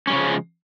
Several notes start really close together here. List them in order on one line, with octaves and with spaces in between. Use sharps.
C#4 G3 C#3 F3 G#3